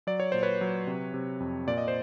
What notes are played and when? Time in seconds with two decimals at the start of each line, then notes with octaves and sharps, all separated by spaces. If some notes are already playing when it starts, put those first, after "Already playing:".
0.07 F#3 D5
0.20 C#5
0.32 A#2 C5
0.43 B4 C#5
0.61 F#3
0.87 C3
1.14 C3
1.40 F2
1.67 A#2 D5
1.78 D#5
1.88 C5